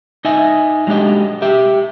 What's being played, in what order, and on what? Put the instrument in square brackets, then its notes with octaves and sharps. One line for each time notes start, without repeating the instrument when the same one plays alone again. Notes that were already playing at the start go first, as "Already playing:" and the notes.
[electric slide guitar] D#4 D#5 E5 G#5
F#3 G#3 D4 G4 D#5
G4 E5